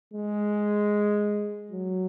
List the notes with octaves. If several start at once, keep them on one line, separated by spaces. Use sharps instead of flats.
G#3
F#3